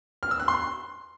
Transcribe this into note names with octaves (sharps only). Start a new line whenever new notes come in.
F6
E6
F#6
C6